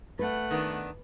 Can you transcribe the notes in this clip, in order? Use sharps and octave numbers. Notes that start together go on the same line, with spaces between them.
A3 B4 F#5
D#3 B3 D4